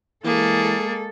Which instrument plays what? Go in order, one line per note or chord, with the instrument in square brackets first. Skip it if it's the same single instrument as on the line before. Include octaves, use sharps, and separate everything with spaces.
[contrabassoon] E3 [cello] G#3 A4 [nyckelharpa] A#3 [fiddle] G#4